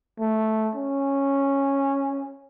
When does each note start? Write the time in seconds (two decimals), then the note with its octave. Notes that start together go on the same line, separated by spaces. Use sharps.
0.20 A3
0.75 C#4